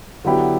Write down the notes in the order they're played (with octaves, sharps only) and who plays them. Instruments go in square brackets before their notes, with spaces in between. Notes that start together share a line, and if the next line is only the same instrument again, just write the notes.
[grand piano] D3 F#3 B3 E4 G4